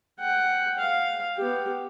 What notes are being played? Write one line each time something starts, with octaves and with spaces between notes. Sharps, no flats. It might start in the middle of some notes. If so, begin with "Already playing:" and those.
F#5 G5
F5
B3 G4